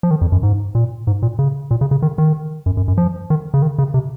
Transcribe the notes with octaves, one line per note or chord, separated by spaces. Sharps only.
F3
D#3
F2
F#2
G#2
A#2
G#2
A#2
C#3
A#2
C#3
C#3
D#3
D#3
F#2
F#2
F#2
F3
D#3
C#3
D#3
C#3
C3